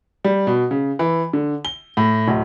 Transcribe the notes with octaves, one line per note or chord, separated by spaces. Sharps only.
G3
B2
C#3
E3
D3
G7
A2
D1